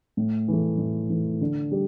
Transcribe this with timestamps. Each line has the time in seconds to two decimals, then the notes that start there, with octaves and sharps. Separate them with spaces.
0.17 A2
0.48 E3 A3
0.78 A2
1.10 E3 A3
1.41 D3
1.72 G3